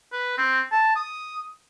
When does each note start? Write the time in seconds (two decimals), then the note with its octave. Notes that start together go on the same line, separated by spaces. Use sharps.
0.12 B4
0.38 C4
0.72 A5
0.96 D#6